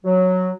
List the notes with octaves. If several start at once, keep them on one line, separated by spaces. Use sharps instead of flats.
F#3